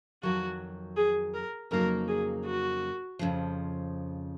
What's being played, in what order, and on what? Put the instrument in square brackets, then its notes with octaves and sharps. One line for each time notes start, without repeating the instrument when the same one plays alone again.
[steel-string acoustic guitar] F2 D#3 F#3 [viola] F#4
[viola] G#4
A#4
[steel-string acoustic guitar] F2 C#3 F#3 A#3 D#4 [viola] A#4
[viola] G#4
F#4
[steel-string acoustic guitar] F2 C#3 F3